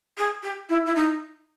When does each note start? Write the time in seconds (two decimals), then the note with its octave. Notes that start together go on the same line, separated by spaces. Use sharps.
0.17 G#4
0.42 G4
0.69 E4
0.86 E4
0.95 D#4